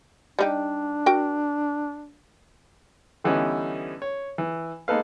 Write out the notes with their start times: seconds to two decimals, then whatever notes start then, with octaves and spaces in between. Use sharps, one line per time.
0.39 G3 D4 D#4 G4
1.06 F#4 A#4 G5
3.24 D3 E3 G3 B3 C#4 D#4
4.02 C#5
4.38 E3
4.88 G#3 A#3 D#4 A4 B4 F5